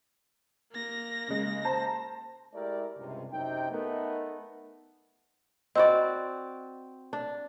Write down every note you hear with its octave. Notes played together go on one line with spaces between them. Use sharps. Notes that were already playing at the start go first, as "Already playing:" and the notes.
A#3 A#6
C#3 G#3
C5 A5 A#5
G#3 A3 E4 G4 A#4 D5
C#2 G2 C3
F#2 C3 D#4 G5
A3 B3 D#4 A#4
C4 F#4 D5 D#5 B5
D4